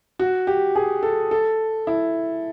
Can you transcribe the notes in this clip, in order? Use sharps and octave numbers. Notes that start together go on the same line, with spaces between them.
F#4
G4
G#4
A4
A4
E4